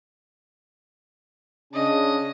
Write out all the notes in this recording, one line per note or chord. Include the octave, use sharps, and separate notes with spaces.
C#3 C#4 D4 D#5